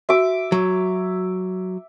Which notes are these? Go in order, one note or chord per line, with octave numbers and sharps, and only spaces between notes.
F#4 E5 D6
F#3